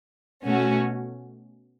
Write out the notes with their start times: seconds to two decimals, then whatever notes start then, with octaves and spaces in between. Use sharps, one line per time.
0.45 B2 A3 C#4 F#4